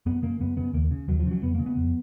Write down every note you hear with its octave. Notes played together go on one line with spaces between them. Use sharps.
F#2 B3
C#3 A#3
F#2 B3
C#3 B3
D#2 A#3
C#3
D#2 F#3
F3
C#3 F#3
F2 B3
A#3
C#3
B3
F2